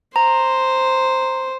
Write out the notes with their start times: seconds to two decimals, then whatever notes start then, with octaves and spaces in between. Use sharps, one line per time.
0.16 C5 A#5